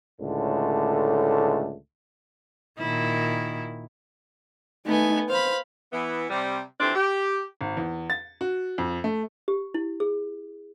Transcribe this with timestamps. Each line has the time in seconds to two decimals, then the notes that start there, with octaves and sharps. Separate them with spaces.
0.20 C#2 A2 D3 A3
2.79 A#2 D#3 E4
4.86 A3 B3 D#4 G#5
5.29 C5 F5 B5
5.92 E3 B3
6.30 C3 G3
6.80 E3 F3 G3 A3 C4 D4
6.95 G4
7.61 G#1
7.77 E2
8.10 A6
8.41 F#4
8.78 F2
9.04 A3
9.48 G4
9.74 E4
10.00 G#4